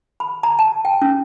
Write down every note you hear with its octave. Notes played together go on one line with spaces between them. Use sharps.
B5
A#5
A5
G5
C#4